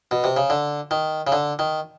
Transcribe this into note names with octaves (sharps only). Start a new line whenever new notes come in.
B2
C3
C#3
D3
D#3
C#3
D3
D#3